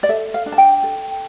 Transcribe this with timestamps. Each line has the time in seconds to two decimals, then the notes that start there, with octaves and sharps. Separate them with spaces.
0.03 D5
0.09 A4 E5
0.34 F5
0.46 D4
0.52 A5
0.58 G5
0.83 A4